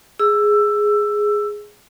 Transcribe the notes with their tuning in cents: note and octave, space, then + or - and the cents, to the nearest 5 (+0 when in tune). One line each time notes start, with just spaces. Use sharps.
G#4 +0 E6 +10